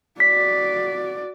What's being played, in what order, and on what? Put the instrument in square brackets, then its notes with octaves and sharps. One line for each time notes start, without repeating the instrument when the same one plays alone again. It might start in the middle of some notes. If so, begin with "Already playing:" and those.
[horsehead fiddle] F#4 D5 [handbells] B6